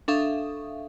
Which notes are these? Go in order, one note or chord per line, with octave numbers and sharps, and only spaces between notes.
D4 A4 E5 F5 C#6 D#6